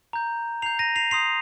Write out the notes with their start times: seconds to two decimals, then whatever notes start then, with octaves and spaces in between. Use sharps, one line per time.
0.13 A#5 G6
0.62 A#5 G6 C7 F7
0.79 A#6 D#7
0.96 C7 F7
1.11 C6 D#6 G6 C7 F7